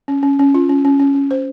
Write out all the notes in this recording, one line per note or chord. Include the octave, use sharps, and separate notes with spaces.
C#4
C#4
C#4
F4
C#4
C#4
C#4
C#4
C5